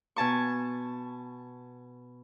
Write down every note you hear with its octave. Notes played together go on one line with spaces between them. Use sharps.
B2 G#5 A5 C#6